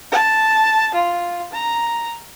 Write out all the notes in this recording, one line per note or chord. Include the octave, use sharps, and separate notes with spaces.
A5
F4
A#5